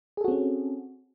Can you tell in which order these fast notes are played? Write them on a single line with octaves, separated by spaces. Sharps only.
G#4 A4 F#4 C4 C#4